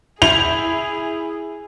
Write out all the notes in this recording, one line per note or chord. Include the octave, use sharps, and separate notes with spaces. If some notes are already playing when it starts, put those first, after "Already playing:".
E4 G#4 F7